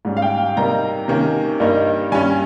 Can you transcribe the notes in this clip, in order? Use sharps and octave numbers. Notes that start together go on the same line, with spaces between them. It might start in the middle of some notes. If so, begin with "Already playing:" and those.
G#2 G3 C#4
F5
G5
C3 G3 A#3 D#4 A#5
C3 D#3 A#3 C#4
G2 G3 A#3 D#4
G2 G3 C#4 G#5